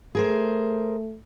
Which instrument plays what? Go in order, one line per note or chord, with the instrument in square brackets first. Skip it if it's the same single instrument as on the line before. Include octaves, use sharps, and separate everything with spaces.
[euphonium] A3 [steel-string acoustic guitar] G#4 A#4 C5